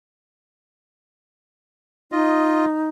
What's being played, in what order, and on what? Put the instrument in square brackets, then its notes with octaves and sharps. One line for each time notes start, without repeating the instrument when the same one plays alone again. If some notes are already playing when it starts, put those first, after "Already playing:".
[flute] D#4 [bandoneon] F4 D#5